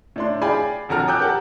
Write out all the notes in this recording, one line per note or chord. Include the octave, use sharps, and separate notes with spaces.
A2 D4 C6
G#4 D5 F5 G5 G#5 B5
A#1 F2 F#4 A4 A#5 F6
G5 G#5 D6 E6 F#6 G6
G4 A#4 F#5 A5